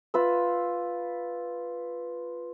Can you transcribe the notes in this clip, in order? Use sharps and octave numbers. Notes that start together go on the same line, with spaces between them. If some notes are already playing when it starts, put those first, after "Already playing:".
F4 B4 E6